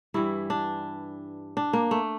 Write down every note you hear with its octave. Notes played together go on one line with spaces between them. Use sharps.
G2 E3 G3 E4
D4
D4
A#3
A3